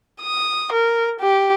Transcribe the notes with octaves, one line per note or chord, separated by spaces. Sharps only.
D#6
A#4
G4